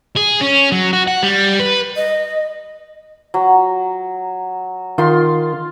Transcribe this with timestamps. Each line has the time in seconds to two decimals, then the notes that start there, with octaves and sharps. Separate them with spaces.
0.16 G#4
0.41 C#4
0.72 F#3
0.93 F#4
1.08 F#5
1.23 G3
1.60 B4
1.95 D#5
3.34 F#3
4.98 D#3 F4 C6